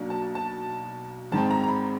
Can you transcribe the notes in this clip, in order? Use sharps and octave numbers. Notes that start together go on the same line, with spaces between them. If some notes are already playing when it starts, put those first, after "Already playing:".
Already playing: B1 B2 F#3 A#3 D4
A5
A5
G#1 G#2 D#3 G#3 C4 A5
A#5
A#5
B5